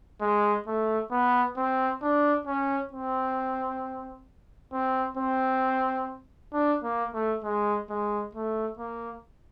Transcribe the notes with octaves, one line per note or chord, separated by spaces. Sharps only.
G#3
A3
B3
C4
D4
C#4
C4
C4
C4
D4
A#3
A3
G#3
G#3
A3
A#3